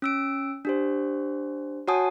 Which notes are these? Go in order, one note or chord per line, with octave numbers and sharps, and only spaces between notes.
C#4 E6 D7
D4 G4 C5
F#4 C#5 F#5 G#5 A5 D#6